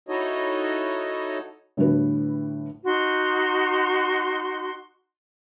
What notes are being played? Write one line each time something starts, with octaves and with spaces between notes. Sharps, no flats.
D#4 E4 F#4 A4 C#5 D#5
A2 D3 G3 D4 F#4 B4
D#4 F#4 C6